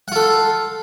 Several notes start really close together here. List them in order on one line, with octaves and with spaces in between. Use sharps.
F#5 F4 A4